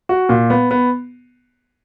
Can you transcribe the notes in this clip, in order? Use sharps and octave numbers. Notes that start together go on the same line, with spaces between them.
F#4
A#2
B3
B3